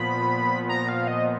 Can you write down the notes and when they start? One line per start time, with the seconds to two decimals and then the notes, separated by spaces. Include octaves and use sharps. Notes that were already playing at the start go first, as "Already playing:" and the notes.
Already playing: A#2 F3 B3 B5
0.69 A#5
0.89 F5
1.08 D#5